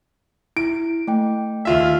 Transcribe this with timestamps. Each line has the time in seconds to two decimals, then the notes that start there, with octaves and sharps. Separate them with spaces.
0.57 E4 D7
1.08 A3 G5
1.65 D#2 F4 E5